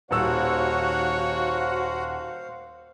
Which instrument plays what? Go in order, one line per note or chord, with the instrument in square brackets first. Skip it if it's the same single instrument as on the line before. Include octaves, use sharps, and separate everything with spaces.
[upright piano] D#1 E6 [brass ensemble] D#2 C#5 [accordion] F#4 F#5 [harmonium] C5 F5